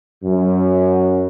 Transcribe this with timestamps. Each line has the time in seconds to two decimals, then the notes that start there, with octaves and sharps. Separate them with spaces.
0.23 F#2